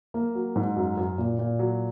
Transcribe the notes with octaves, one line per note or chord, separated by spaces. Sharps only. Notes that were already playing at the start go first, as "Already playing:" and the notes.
A#3
F#3
G#2
F#2
F#2
A#2
A#2
F#3